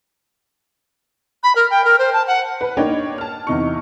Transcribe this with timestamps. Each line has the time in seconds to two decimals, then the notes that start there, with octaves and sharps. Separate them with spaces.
1.43 B5
1.55 A#4
1.70 G5
1.84 A#4
1.98 C5
2.13 A5
2.27 F#5
2.61 B4
2.77 A#3 D4 D#4 C#5 G5
3.18 A5 F6
3.47 E2 C3 D#4 C#6